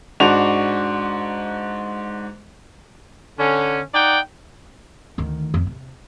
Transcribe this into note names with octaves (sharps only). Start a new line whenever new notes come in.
G#2 D4 F#4 F7
D3 C#4
D#4 D5 F#5 G5
D2 D#3
F2
C3